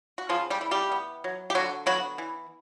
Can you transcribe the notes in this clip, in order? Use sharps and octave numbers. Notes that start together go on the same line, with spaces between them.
F#4
C#3 F3 F4
G3 G4
E3
G3 G4
B3
F#3
G4
D3 F#3 F#4
F#3 B3 F#4
E3